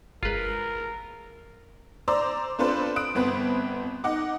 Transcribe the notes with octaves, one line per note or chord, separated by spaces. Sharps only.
G1 G#3 F4 A#4 B4
C5 D5 A#5 C6 D6 E6
C4 D4 F4 A4 B4 C5
D#6 F#6 D7
G1 B3 C4 B4 F#6
D#4 F#5 D6